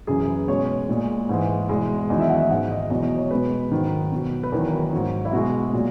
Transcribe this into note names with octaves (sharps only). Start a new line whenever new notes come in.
F#2 C#3 E3 G#4
B4
B2 G#3 C#5
A#2 G#3
G#2 E3 G#3
E2 B2 G#3
E2 D#3 F#3 D#5
E5
F#5
E5
G#2 D#3 G#3 F#5
D#5
E2 B2 F#3 D#5
C#5
B2 G#3 B4
G#2 D#3 F#3
B2 F#3
B4
E2 D#3 F#3 A#4
G#2 F#3
E4
B2 G#3 F#4
A#2 F#3